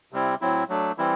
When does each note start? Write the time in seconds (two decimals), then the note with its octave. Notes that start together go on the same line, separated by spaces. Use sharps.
0.12 C3 G3 C4 E4
0.41 A2 F#3 C4 E4
0.69 F#3 A3 D4
0.98 E3 G3 C4 E4